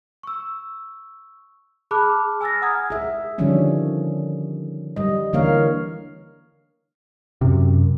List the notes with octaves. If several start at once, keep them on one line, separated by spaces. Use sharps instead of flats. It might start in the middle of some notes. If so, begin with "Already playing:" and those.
C#6 E6
G#4 A5 B5 D6 F6 F#6
G#5 E6 F6 A6 A#6
F#5 A#5 D#6 F6 G#6
G#4 E5
D3 D#3 F3 G3 C#4 D4
G3 D#5
D3 E3 A#3 A#4 C#5 F5
F#2 C3